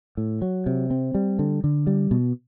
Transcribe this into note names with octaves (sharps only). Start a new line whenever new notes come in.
A2
F#3
C3
C4
G3
D3
D3
G3
B2